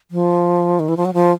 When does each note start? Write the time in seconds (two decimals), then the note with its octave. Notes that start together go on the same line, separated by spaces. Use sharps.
0.11 F3
0.80 D#3
0.89 E3
0.97 F3
1.05 F#3
1.14 F3